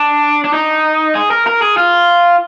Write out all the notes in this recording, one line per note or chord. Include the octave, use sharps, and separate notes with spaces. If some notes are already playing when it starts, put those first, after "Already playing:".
Already playing: D4
D4
D#4
G#4
A#4
A#4
G#4
F4